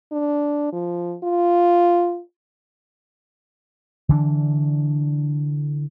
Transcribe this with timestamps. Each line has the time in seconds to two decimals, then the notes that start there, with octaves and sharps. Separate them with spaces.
0.12 D4
0.73 F3
1.24 F4
4.09 D3 E3 D4